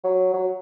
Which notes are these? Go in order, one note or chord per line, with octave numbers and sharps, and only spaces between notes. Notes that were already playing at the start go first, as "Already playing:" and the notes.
F#3
F#3